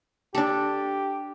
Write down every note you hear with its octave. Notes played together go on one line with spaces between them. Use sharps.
D4 G4 A4